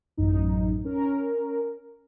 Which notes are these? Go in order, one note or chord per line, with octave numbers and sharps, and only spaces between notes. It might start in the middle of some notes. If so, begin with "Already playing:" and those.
A1 F#2 D#4
C#4 A#4